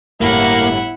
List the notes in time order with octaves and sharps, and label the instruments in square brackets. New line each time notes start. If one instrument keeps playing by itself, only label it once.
[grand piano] G1 A2 G3 [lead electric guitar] A#3 [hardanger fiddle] E4 F#5